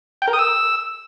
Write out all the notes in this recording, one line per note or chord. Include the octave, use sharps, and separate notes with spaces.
G5
A#4
D#6
E6